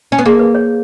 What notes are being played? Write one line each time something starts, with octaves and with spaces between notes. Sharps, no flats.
C#4
B3
A#3 G#4
B4
C#5